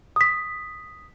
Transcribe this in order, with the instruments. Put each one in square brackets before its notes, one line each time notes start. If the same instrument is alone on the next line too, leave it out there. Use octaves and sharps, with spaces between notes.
[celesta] D#6 B6